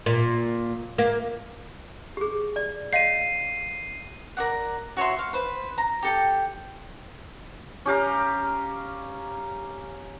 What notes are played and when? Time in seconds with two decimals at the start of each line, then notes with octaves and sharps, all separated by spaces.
0.06 A#2
0.98 A#3
2.17 G4 G#4
2.56 D5
2.93 C#5 D#5 F5 C7 D#7
4.37 A#4 D5 F#5
4.97 F#4 C#5 E5 C6
5.19 F5
5.33 B4 C5
5.78 A#5
6.03 G4 A4 G5
7.86 C#4 G4 F5 A#5